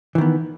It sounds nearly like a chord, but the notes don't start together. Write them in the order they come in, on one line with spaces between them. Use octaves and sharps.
E3 D#3 B3